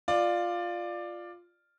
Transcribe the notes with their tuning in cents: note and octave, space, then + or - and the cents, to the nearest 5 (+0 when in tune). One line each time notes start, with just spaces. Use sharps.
F4 +0 D5 +15